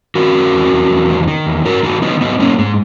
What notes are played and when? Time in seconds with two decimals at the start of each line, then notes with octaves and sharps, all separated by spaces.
0.15 D#3 F#4 A#4
0.34 D#3
0.53 E2
0.72 E2
0.91 E2
1.09 D#3
1.28 D#3
1.47 E2
1.65 G#2 F#4 A#4
1.83 D#3 D#4 F#4
2.02 D#3 B3 D#4
2.20 G#2 B3 D#4
2.39 G#2 A#3 C#4
2.58 G#2 G#3